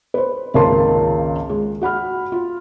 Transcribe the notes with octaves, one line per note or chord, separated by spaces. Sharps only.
B4 C5
G#1 C#2 A#3 A#4 A5 C6
G#3
F#4 F#5 B5 F6
F4